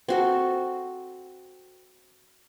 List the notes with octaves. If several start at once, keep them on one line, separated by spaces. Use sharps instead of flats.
C4 F#4 A4